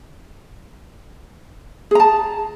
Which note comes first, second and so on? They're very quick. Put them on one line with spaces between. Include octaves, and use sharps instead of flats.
G#4 A#5 A5